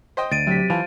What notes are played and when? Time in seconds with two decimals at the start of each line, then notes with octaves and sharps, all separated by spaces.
0.17 C5 D#5 G5
0.32 D2 A6 D7 D#7
0.47 C3 F#3 G4 B6
0.70 E3 F4 C5 A5